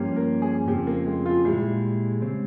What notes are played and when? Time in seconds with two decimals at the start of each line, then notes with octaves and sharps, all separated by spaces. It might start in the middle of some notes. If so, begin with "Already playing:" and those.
Already playing: G2 F3 A#3 C#4 G4
0.16 A#4
0.42 G#4
0.68 F2 C#3 F3 C4 G4
0.87 A#3
1.06 G#3
1.26 F4
1.45 A#2 G3 G#3 E4 G#4
2.22 C#3 G#3 C4